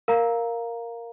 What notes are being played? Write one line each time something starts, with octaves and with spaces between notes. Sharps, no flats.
A#4 F5 A#5